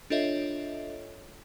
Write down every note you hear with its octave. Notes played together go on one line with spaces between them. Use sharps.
D4 F4 A4 C#5 D#5 E5